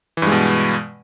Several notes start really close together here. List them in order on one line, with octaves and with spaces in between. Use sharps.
E3 G2 G#3 B2